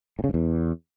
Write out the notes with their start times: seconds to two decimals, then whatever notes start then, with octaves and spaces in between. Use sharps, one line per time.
0.19 A2
0.24 C#3
0.29 G#2
0.34 E2